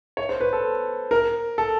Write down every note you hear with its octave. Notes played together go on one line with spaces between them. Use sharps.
C#5
C5
B4
A4
A#4
A4